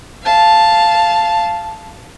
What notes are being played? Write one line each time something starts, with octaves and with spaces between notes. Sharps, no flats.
F5 A5